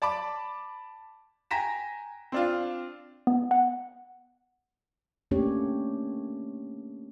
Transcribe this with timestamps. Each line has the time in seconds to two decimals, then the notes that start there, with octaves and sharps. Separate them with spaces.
0.02 D5 A5 B5 D6
1.51 G5 G#5 A#5 A#6 B6 E7
2.32 C4 D4 F4
3.27 B3
3.51 F#5
5.31 A3 A#3 C#4 D4 G4 C#5